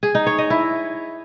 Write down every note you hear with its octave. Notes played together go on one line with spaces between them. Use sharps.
G#4
D#4
C#5
D#5
E4